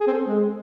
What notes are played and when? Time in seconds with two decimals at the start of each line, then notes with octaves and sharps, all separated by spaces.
0.01 G#4
0.07 C4
0.14 A4
0.21 C4
0.27 G#3